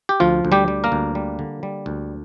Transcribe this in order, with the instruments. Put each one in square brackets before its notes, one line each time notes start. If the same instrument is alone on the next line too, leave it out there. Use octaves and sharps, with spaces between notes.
[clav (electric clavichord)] G4
D2 F3 F4
D2
G3 G4
G3
A#3 A#4
D2
G3
D3
G3
D2